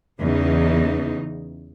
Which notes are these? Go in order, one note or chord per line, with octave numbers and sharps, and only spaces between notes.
E2 C#3 D#4